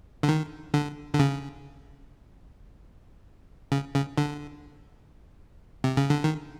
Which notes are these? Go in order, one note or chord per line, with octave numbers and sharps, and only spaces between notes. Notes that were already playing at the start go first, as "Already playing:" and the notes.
D3
D#3
D3
D3
C#3
C#3
C#3
D3
C3
C#3
D3
D#3